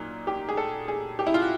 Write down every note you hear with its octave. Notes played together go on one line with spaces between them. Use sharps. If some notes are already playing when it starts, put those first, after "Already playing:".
Already playing: A#2 F#3 D#4
G4
G#4
A4
G#4
G4
E4
F4
F#4